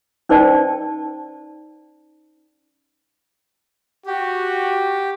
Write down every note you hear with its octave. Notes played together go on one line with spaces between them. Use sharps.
C#4 D#4 C5 D5 G5 A5
F#4 G4